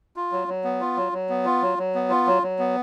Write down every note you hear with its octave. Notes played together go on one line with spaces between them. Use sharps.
F4
F#3
F#3
B3
F4
F#3
F#3
B3
F4
F#3
F#3
B3
F4
F#3
F#3
B3